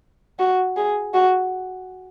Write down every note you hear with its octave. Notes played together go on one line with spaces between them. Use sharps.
F#4
G#4
F#4